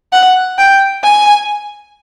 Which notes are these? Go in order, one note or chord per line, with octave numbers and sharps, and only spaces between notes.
F#5
G5
G#5